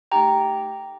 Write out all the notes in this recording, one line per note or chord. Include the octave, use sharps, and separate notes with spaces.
A3 D#4 G4 G5 A#5